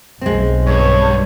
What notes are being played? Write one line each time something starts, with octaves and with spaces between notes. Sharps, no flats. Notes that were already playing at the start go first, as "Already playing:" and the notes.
B1 G#3 C4
G2 C#5